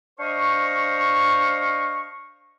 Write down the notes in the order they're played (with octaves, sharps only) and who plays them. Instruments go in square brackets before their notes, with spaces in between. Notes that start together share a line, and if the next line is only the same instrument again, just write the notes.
[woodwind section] D4 C5 D#5 F5 C#6